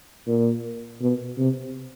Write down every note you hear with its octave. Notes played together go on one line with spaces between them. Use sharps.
A#2
B2
C3